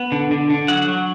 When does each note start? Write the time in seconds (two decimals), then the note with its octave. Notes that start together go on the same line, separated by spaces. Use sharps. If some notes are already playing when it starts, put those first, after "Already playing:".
Already playing: B3
0.12 D3
0.31 D3
0.50 D3
0.68 F#3 F#5
0.88 F#3